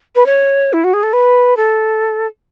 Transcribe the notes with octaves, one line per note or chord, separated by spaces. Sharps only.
B4
C#5
E4
F#4
G#4
A4
B4
A4